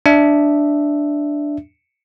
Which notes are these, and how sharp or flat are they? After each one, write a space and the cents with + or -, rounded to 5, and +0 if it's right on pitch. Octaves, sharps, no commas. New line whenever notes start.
D4 +0 E5 +0